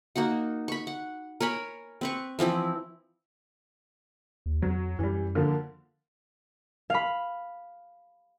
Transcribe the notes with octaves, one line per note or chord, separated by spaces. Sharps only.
A#3 D#4 F#4 F#5
B5 C#6
F#5
A#4 C#5 G#5 B5
C4 B4 C#6
E3 F3 C4 E4
D#2
F2 F#3
F#2 E3 G3
D3 F3 A#3
F5 B5